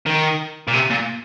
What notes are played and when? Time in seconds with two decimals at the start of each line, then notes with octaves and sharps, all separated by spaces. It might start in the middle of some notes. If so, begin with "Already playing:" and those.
0.06 D#3
0.68 A#2
0.73 C3
0.90 A#2